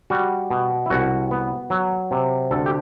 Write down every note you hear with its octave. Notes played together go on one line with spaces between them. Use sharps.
G3 F#4
B2
E4
C2 F#4
B3
F#3
C3
D2 A4
G4